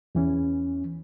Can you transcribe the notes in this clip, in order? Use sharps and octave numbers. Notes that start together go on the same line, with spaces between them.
E2 E3 C#4